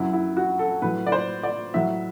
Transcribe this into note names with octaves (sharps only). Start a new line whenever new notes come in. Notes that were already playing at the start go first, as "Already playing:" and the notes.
Already playing: F#2 F#3 E4
E4
F#4
A4
A2 F#3 B4
D5
C5
D5
A2 F#3 E5